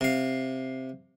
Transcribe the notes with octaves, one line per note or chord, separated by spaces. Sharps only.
C3 F5